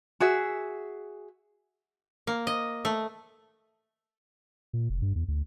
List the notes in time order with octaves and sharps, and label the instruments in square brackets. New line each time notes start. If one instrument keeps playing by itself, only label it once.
[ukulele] F#4 G#4 E5
[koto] A#3
D#5
A3
[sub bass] A#2
F1
G2
E2
D2